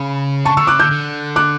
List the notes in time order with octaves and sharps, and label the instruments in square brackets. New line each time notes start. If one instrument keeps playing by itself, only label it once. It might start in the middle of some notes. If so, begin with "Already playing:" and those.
Already playing: [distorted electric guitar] C#3 [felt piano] B5
[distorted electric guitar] D3 [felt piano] A5 C#6
[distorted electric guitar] D3 [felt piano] C#6 E6
[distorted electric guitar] C#3 [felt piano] D6 F#6
[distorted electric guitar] D3 [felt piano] E6 G6
[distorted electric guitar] D3
[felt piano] D6 F#6